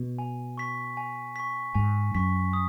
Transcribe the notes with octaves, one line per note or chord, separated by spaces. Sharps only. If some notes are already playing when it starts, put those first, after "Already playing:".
Already playing: B2
G#5
C#6 B6
G#5
C#6 B6
G#2 G#5
F#2 C#6 B6
D#6